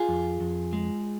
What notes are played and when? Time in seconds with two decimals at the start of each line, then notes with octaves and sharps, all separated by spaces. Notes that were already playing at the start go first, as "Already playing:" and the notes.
Already playing: F4 G#4
0.09 F2
0.41 F2
0.73 G#3